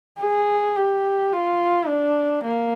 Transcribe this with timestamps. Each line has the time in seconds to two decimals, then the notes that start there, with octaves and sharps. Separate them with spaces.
0.20 G#4
0.76 G4
1.32 F4
1.87 D4
2.44 A#3